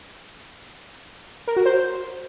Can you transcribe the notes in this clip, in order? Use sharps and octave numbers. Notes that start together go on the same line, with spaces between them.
A#4
F#4
C5